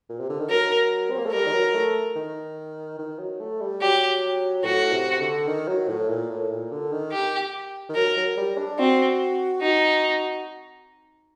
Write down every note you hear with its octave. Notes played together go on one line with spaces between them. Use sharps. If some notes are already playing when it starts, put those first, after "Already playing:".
A#2
C3
D3
D#3
F#3 A#4
C4
A#3
A3
G3 A#4
D#3
F#3
A3
D#3
D#3
F#3
A3
G3
F#3 G4
A2 F#4
C3
D3
D#3
F#3
A2
A#2
A2
A#2
D3
D#3
G4
D#3
F#3 A#4
F#3
G3
D4
C4 F#4
D#4 F#4